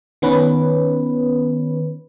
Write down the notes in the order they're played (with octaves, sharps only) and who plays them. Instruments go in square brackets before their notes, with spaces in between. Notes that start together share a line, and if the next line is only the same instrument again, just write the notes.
[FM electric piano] D#3 B3 C#4 B4